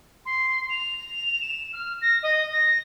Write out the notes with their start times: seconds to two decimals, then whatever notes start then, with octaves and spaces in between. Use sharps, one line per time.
0.26 C6
0.70 F7
1.41 E7
1.73 F6
2.01 A#6
2.23 D#5
2.52 A#6